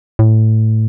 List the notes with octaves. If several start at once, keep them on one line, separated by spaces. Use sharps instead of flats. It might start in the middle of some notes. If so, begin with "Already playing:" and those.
A2